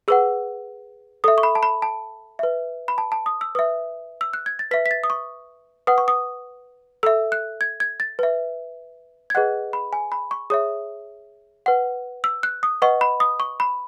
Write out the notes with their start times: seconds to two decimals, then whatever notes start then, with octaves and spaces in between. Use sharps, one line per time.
0.08 G#4 B4 F#5 E6
1.24 A4 E5 D#6
1.38 C#6
1.43 B5
1.55 A5
1.63 B5
1.82 A5
2.39 B4 E5
2.88 B5
2.98 A5
3.12 A5
3.26 D#6
3.41 E6
3.55 B4 E5 D#6
4.21 E6
4.34 F#6
4.46 G#6
4.59 A6
4.71 B4 E5 B6
4.86 B6
4.91 A6
5.04 D#6
5.10 C#6
5.87 B4 F#5 D#6
5.98 C#6
6.08 D#6
7.03 A4 E5 E6
7.32 F#6
7.61 G#6
7.80 G#6
8.00 A6
8.19 B4 E5
9.30 G#6
9.35 G#4 B4 D#5 F#5 F#6
9.73 B5
9.93 G#5
10.12 B5
10.31 C#6
10.50 G#4 C#5 E5 D#6
11.66 B4 F#5
12.24 E6
12.43 F#6
12.63 D#6
12.82 B4 D#5 F#5 C#6
13.01 B5
13.20 D#6
13.40 C#6
13.60 B5